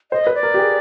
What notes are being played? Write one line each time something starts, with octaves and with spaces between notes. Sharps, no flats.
C5 D#5
B4
D5
A#4
G4
G#4